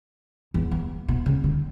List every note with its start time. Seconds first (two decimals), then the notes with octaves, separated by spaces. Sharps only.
0.54 E2
0.71 E2
1.08 B2
1.26 C#3
1.44 D3